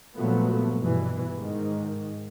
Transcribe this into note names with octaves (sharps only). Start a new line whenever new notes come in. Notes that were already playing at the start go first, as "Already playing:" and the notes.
G2 A#2 F3 F#3 A3 B3
G2 B2 E3
G#2 D#3